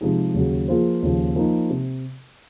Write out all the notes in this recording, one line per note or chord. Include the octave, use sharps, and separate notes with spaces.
C3 F3 G#3 D#4 G#4
D#2 C#3 F#3
F3 A#3 F4 G#4 C5
D#2 C#3 F3
F3 A#3 D#4
C3